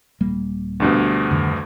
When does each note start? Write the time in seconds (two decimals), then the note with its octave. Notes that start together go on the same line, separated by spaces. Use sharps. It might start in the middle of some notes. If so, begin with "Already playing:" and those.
0.20 D#1 G3 A#3
0.80 D2 G2 B2
1.31 F2 D3 D#3